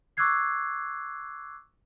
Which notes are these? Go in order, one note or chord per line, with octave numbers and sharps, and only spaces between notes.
C#6 D6 E6 F#6 G#6 C7